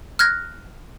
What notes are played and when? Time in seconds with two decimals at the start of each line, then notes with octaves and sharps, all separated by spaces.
0.19 F6 F#6 G#6 A#6